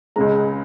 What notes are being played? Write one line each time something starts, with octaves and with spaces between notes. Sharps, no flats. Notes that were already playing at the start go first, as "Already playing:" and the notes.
C#2 C#3 G#3 A#5